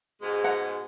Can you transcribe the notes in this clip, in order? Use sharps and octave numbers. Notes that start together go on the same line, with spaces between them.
G#2 B2 G#3
F#5 A#5